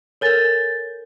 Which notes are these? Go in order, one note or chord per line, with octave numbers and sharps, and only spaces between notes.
A4 A#4 C#5 G#5 G6 A6